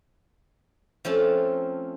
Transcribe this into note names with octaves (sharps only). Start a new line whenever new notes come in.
F3 A3 C4 C#4 F4 A4